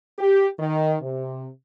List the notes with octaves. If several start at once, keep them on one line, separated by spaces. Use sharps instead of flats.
G4
D#3
C3